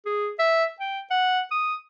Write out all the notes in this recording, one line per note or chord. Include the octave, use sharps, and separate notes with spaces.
G#4
E5
G5
F#5
D#6